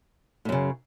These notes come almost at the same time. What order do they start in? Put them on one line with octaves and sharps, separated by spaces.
A2 F#2 C#3